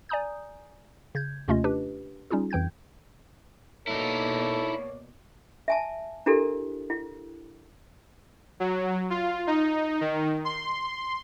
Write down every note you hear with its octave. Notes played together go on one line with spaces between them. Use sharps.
D5 G#5 A#5 D#6 G6
C#3 G6 G#6
D#2 C3 A3 C#4 F4 D#5
D4 G4 B4
G3 C#4 D#4 F4 G#4
F2 E3 G5 G6 G#6
B2 A#3 D#4 E4 A4 C#5 D5
E5 G#5 A5
D4 E4 G4 A4 A#4
E4
F#3
F4
D#4
D#3
C6